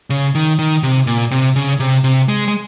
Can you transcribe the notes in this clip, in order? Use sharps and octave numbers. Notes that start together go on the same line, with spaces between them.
C#3
D#3
D#3
C3
A#2
C3
C#3
C3
C3
G#3
G#3